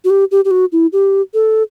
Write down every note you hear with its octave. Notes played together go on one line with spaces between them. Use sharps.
F#4
G4
G4
G4
F#4
E4
G4
A4